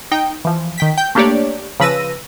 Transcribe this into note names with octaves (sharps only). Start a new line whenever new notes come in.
D#4 G5
E3 F3
D#3 G5 B6
G5 G6
A3 A#3 D4 G4 C#5 D5
C#3 F3 B4 E6 A#6 D#7